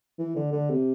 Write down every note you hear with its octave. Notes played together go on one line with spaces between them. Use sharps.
E3
D3
D3
C3